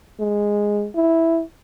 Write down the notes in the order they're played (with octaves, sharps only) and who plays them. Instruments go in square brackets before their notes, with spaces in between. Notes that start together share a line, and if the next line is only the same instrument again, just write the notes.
[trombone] G#3
E4